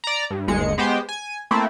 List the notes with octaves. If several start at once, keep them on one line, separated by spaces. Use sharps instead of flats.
D5 A#5
G2
G1 D#2 G#3 C#7
G#3 B3 G4 C5 G5
G#5
A3 A#3 C4 E4